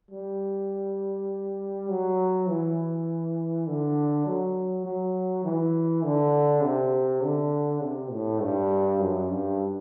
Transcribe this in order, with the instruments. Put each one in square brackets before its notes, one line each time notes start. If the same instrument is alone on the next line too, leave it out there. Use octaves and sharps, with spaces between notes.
[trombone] G3
F#3
E3
D3
F#3
F#3
E3
D3
C3
D3
C3
A2
G2
F#2
G2